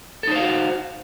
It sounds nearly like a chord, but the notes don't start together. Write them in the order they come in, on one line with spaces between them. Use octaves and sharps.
A4 D#4 C5 F5 F#4